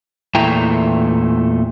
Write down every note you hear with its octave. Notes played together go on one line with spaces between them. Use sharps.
E2 A#2 A3 E4 G5 A#5